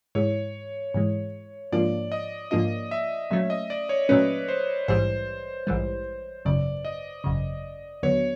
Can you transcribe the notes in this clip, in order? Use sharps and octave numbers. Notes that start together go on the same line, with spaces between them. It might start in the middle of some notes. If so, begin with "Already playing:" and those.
G#2 E3 G#3 C#5
G#2 E3 G#3
G#2 F3 A#3 D4 F4 D5
D#5
G#2 F3 A#3 D4 F4 D#5
E5
A#2 F#3 A3 C#4 E5
D#5
D5
C#5
A#2 F#3 A3 C#4 B4
C5
A#1 G#2 E3 G3 C5
A#1 G#2 E3 G3
G#1 F#2 C#3 D5
D#5
G#1 F#2 C#3
D#2 D3 F#3 B3 C#5